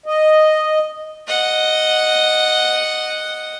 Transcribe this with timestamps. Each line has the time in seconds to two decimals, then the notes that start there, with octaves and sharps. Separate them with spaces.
0.06 D#5
1.27 D#5 F#5